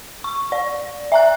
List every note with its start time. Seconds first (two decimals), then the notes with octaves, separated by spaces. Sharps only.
0.24 C#6
0.52 D5
1.12 E5 A#5 F#6